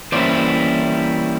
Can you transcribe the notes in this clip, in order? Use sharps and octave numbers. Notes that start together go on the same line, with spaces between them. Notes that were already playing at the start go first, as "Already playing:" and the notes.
E3 G3 A#3 C#4 E4 C5 D5